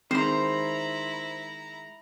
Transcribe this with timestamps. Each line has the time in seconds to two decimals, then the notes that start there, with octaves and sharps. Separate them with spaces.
0.11 D#3 G#3 C4 E4 C5 A#5 C6